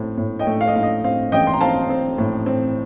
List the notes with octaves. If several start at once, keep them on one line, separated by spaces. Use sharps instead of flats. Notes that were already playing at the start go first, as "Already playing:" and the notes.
Already playing: A2 C4
A2
D#5 G5
A3
F5
D#5
A2 F5
D#5
C4 F5
A1 D#5 G5
C6
A#5
C4 F5 A5
C4
A2
C4